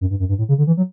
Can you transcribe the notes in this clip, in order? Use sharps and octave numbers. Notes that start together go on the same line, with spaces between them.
F#2
G2
F#2
G2
A2
C#3
D3
E3
F#3